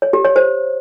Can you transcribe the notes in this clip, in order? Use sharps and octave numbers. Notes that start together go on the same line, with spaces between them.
C#5
G4
C#5
C5